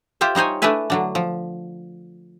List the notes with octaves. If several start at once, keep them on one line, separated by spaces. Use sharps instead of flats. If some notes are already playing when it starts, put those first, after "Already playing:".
F4 G4 C5 E5
G3 D#4 C5 C#5 G#5
A3 D4 E4 B4 E5 G#5
D3 F#3 D4
F3